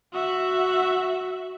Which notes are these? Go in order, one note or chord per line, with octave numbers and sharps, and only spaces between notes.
F#4 E5